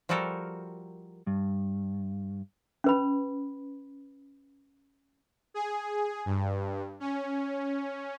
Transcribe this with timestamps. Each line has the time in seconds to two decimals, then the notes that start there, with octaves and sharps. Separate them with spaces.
0.09 F3 G3 F#4 A4 A#4
1.26 G2
2.84 C#4 B4 B5
5.54 G#4
6.25 G2
7.00 C#4